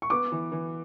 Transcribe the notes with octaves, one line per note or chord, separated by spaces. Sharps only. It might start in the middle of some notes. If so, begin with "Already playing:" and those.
C#6
B3 D6
E3
E3